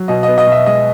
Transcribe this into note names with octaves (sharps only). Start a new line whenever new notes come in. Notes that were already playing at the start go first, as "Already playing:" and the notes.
Already playing: F#3
B2 D#5
B3 D#5
D#5
B2 E5
G#3 D#5